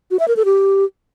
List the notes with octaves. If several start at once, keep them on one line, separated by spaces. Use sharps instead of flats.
F#4
E5
A#4
A4
G4